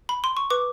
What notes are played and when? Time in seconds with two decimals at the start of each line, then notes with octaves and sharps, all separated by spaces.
0.09 B5
0.24 C6
0.37 C#6
0.50 B4 D6